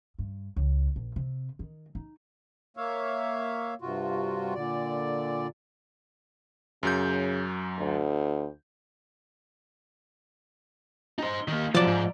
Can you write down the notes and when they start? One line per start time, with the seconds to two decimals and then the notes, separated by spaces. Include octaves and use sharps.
0.19 G2
0.56 C#2
0.96 A#1
1.16 C3
1.59 D#3
1.95 D#4
2.77 A#3 C#5 E5 F5
3.82 G2 C3 F4 F#4
4.55 A#2 D3 D5
6.83 F#2 C#3 F#3 G6
7.78 D2
11.19 D#4 C5
11.48 D#3 A#3
11.75 C3 F3 F#3 D5 A5
11.87 G#2